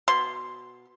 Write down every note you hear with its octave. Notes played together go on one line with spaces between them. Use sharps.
B2 C6